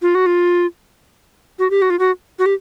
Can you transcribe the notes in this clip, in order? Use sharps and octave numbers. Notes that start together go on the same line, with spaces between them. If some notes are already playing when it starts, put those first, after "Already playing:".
F4
F#4
F4
F#4
G4
F#4
F4
F#4
F#4
G4